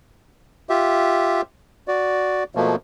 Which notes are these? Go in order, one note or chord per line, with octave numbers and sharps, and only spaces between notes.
F4 G4 E5
F#4 D5
B2 F3 A3 A#3